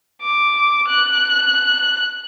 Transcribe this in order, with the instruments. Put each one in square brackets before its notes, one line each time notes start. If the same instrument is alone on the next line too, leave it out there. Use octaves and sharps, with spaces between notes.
[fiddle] D6
F#6